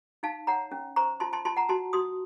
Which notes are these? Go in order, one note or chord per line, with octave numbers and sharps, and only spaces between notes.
D#4 F5 A5
C#5 F#5 A#5
C#4
C5 A#5 C#6
F4 A5 C6
A5 C6
F4 A5 C6
F#5 A#5
F#4 A5 C6
F#4 C6 D#6